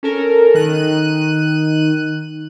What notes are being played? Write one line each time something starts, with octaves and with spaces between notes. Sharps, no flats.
C#4 A4 A#4
D#3 F#6 D#7